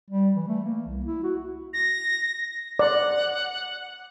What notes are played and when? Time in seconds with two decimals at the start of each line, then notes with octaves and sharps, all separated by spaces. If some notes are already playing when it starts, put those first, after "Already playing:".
0.10 G3
0.36 E3
0.48 A3
0.64 A#3
0.86 C2
1.06 E4
1.24 F#4
1.73 A#6
2.79 D5 F#5